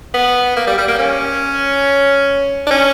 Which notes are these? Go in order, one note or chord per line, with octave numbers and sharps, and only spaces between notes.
B3
A#3
G3
G3
A#3
C#4
D4
C#4